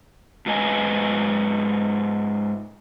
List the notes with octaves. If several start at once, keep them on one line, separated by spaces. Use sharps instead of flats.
G#2 F4 B4 D#5 G#5